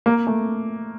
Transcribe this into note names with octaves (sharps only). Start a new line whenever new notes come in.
A#3
A3